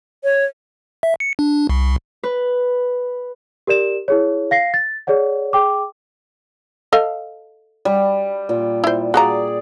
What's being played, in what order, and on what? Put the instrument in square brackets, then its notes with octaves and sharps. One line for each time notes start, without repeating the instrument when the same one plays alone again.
[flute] C#5
[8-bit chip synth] E5
C#7
D4
C2
[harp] B4
[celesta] G4 A#4 D5 E7
E4 G#4 C#5
F5 A#6 C7
A6
G#4 C#5 D5 F#5
G#4 G5 D6
[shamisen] A4 D#5 F5
[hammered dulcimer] G3
A#2
[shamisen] E4 C5
[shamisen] F#4 F5 A#5 [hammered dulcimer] G#4 D5